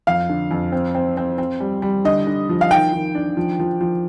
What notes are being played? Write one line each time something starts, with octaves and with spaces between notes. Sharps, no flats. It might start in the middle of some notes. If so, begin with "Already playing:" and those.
F2 F5
D3
F2
C4
C4
C4
C4
G3
G3
D3 D#5
D3
F3
F5
D#3 G5
D#3
D4
F3
F3
F3